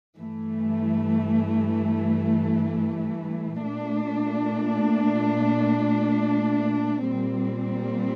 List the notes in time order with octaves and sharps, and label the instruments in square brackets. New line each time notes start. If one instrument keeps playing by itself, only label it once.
[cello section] G2 E3 A3
A#2 A3 D4
A#2 G3 C4